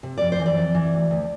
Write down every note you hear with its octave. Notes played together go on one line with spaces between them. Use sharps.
C3
F2 D5
C5
E3
D5
F2
E3
D2
D2